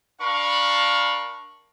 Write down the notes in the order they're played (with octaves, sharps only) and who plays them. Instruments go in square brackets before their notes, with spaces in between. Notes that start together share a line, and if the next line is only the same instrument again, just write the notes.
[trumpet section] D4 A#4 F5 A5 B5 C#6